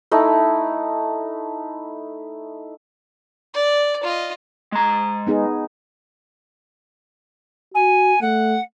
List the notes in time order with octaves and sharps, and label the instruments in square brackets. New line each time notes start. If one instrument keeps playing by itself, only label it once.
[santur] A3 D#4 E4
[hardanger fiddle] D5
F4 D#5
[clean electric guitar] G#3 A#5
[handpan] B3 D#4 G#4
[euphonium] F#4 [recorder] G#5
[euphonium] A3 [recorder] F#5